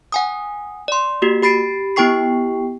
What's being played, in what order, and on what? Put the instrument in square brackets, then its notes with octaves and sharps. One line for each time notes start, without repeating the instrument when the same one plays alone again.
[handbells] F#5 G#5 D#6
D5 C6
A#3 F#4 G4
G4 B5 A6 C7 D7
B3 E4 G4 G5 C#6 C7